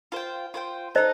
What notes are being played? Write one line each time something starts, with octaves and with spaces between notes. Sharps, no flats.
F4 C5 G5
F4 C5 G5
D#4 A4 C5 D#5